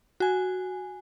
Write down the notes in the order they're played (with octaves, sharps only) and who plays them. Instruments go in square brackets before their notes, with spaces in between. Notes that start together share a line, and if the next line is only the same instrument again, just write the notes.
[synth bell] F#4 G#5